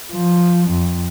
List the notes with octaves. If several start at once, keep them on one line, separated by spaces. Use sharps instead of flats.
F3
F2